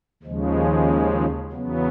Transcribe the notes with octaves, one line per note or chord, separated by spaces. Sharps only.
D#2 C#3 F3 G#3
E2 C#3 F#3 B3